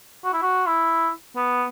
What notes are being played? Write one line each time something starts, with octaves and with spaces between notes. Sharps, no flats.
F#4
E4
F#4
E4
B3